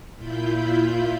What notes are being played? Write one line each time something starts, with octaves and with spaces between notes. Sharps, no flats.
A#2 E4 F4 B5 G6